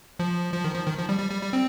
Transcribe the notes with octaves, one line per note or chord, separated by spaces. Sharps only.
F3
F3
D#3
F3
D#3
F3
G3
G3
G3
G3
C4